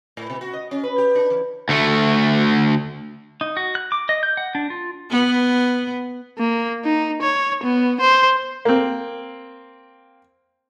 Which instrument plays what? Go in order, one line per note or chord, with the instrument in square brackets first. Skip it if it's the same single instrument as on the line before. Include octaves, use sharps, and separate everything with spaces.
[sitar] A2
B2
F#4
D#5
C#4
B4
G4
D4
E3
[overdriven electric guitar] D2 A3
[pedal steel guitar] D#4
F#4
F#6
D6
D#5
G6
F#5
D4
F4
[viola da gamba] B3
[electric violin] A#3
D#4
C#5
B3
C5
[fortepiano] A#3 C4